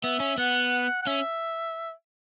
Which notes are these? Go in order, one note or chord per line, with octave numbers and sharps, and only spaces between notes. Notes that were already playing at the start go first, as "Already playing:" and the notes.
B3 E5
C#4
B3 F#5
F#5
C#4 E5